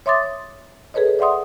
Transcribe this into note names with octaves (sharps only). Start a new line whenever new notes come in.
C#5 E5 C6 D6 D#6 A6
G#4 A4 B4 C#5 D#5
D5 E5 F#5 C6 D#6